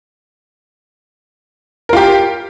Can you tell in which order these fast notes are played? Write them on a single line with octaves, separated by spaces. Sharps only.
A#4 F4 G4